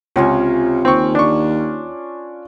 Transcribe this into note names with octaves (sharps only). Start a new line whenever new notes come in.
C#2 C3 C#4 F4 C#5
D#2 C4 C#6
D4 C#6